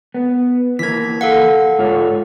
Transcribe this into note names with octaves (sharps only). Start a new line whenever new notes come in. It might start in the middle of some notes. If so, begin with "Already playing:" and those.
B3
E3 A#3 G#6 B6
A4 F5 F#5
G#2 F4 C#5